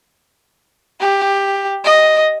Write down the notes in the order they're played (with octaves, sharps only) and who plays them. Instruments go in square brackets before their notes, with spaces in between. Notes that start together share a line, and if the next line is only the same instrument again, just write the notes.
[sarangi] G4
D#5